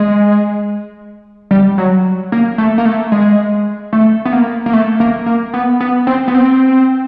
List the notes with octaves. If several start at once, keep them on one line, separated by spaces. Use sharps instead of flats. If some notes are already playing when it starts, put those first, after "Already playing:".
Already playing: G#3
G3
F#3
A#3
A3
A#3
A3
G#3
A3
B3
A#3
A#3
A3
A#3
A#3
B3
B3
C4
B3
C4